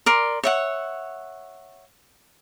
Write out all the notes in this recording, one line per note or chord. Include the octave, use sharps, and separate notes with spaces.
A#4 D5 C6
C#5 E5 F#5